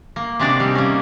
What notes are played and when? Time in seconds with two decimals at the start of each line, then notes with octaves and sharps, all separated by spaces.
0.16 A#3
0.39 C3 G#3 D4 F#4 D5
0.60 G3 D#4
0.75 A#3 C#4